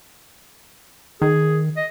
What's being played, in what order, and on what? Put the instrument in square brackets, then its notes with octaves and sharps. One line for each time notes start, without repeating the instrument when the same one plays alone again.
[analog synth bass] D#3 [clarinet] G#4
[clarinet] D#5